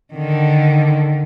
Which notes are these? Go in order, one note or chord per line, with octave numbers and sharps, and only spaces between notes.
D3 D#3